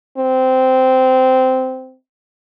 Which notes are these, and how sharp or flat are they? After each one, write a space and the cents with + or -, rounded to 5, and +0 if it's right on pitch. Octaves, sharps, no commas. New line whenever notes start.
C4 -15